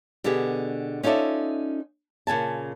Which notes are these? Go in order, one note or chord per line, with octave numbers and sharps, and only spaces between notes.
B2 D3 B3 G4 G#4
C#4 D#4 F4 A4 D5 E5
A#2 C#3 G#5 A5